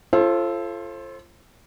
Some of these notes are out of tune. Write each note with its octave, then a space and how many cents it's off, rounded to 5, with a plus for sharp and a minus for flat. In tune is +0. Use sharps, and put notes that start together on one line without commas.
F4 -30 A4 -5 C5 +30